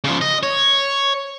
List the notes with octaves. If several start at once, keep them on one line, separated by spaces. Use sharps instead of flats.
C#3 F3
D#5
C#5